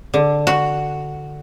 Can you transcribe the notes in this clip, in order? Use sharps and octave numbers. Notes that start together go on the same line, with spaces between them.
D3
F#4